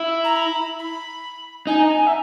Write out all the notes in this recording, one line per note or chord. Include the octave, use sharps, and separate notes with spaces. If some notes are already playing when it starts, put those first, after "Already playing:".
Already playing: E4
A#5
B5
B5
D#4 G#5
A#5
G#5
E5